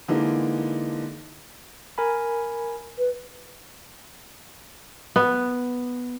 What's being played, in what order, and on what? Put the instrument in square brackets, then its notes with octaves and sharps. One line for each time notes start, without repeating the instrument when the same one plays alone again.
[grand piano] D3 E3 G#3 A#3 D#4
[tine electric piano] A#4 G#5 B5
[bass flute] B4
[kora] B3